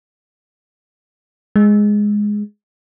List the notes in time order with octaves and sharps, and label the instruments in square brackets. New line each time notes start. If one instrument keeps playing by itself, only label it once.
[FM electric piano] G#3